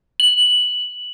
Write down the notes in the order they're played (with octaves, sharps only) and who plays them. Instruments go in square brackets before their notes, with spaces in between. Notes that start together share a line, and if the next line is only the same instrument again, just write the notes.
[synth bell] F#7